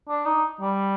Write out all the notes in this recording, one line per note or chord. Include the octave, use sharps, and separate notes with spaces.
D4
D#4
G3